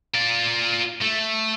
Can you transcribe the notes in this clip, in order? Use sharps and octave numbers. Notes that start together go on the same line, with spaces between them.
F4 D5
A3